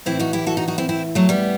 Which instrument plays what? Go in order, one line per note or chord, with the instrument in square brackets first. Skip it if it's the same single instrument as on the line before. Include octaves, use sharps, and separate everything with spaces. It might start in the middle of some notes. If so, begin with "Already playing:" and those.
[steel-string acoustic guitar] A2 E3 C4 E4
D#4 F#4
E4 G4
F#4 A4
D#4 F#4
D#4 F#4
C4 E4
C4 E4
F#3 A3
G3 B3